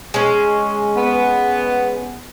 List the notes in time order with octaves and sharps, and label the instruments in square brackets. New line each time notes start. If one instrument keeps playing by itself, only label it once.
[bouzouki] G#3 C#4
[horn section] B3